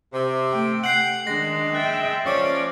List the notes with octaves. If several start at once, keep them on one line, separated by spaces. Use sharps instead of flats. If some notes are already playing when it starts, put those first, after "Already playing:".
C3
A3 G5
F#5 C7 F#7
D#3 G#3 D4 A#6
E5 G5 F#6 A6
F3 C#4 D5